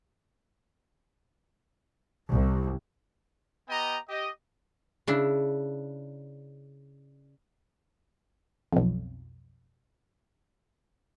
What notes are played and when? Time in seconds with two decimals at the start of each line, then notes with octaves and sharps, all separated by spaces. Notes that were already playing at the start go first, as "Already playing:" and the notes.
2.30 C2
3.69 B3 G4 D#5 G5 A#5
4.09 G4 D#5
5.07 C#3 D4 E4
8.73 B1 F2